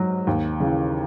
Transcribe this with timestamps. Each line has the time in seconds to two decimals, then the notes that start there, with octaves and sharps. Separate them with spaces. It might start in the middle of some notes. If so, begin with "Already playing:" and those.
Already playing: G#2 F#3
0.27 D#2
0.60 C#3 E3